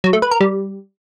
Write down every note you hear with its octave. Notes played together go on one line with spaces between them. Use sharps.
F#3
A3
B4
A#4
G3